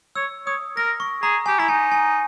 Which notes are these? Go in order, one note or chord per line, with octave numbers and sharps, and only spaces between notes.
C#5 E6
C#5 D#6
A#4 A#6
C#6
G#4 A#5
G4 G#5
E4 A#5
D#4 G#5
G#5